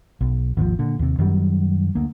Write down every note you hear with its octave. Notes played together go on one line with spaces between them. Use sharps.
B1
G#1 D#2 C#3 F3
A#2 D3
D#2 C3
F#2 D#3 F#3 G3
D2 A#3